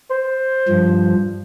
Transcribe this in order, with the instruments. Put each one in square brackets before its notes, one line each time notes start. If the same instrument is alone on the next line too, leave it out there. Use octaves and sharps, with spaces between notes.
[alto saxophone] C5
[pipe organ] G2 F3